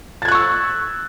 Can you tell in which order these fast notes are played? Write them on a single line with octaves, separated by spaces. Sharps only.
A6 G#6 F#6 C#6 E6